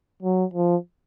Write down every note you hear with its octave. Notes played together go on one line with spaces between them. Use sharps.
F#3
F3